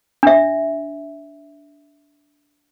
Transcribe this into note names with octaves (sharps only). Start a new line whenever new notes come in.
D4 E5